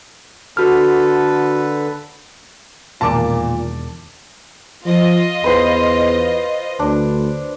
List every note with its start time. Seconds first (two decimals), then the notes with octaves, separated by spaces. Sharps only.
0.57 D3 F#4 A4 B4 F6
3.01 E1 A#2 D#3 A5 D6
4.85 F3 F4 D#5
5.44 E2 B4 C5 C6
6.79 D2 D4